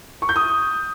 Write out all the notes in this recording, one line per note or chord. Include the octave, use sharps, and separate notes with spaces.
C#6
G6
D#6